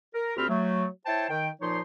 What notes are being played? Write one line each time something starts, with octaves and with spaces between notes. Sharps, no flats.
A#4
D2 C4 F4 G4 B5 F6
F#3 A3
E4 C5 C#5 G5 A5
D#3 G5
A#2 F3 D#4 C#5 C6